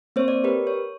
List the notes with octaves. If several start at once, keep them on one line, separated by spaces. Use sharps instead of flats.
A#3 C4 C5 C#5
D5
G4 A#4 B4
C#5